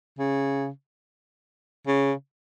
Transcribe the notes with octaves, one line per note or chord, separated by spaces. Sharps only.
C#3
C#3